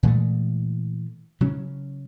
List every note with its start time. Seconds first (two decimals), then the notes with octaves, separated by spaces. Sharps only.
0.03 A#2 E3 G#3 A3
1.41 C#3 F#3 C#4